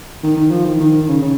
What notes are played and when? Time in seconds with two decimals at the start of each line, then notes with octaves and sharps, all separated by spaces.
0.23 D#3
0.36 D#3
0.51 F3
0.65 D#3
0.80 D#3
1.08 C#3
1.22 C#3